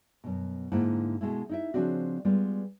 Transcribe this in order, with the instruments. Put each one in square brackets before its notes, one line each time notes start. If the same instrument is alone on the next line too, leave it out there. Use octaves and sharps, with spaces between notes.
[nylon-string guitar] F#2 B2
G#2 D3 A#3 E4 F#5
B2 G#3 A3 E4
D#4 E4 E5
C#3 F3 G3 C4 D4 F#4
G3 G#3 B3 F4